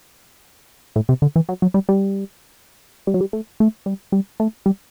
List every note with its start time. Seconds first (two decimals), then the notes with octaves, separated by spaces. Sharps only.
0.96 A2
1.09 C3
1.22 D3
1.36 E3
1.49 F#3
1.62 F#3
1.74 G3
1.89 G3
3.07 G3
3.14 F#3
3.21 G3
3.33 A3
3.60 A3
3.86 G3
4.12 G3
4.40 A3
4.66 G3